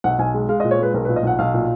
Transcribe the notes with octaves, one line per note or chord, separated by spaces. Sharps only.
B1 F#5
B1 G#5
G#3
G#3 F5
D#5
A#2
C#5
G#3 B4
B1 A#4
B4
A#2
D#5
B1 F#5
B1 F5
A#2